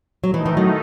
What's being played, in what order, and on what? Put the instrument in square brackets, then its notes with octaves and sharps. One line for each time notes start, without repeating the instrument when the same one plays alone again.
[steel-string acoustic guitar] F#3
[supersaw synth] D#3 A3 D#4 [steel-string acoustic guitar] E3
[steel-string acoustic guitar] E3
F#3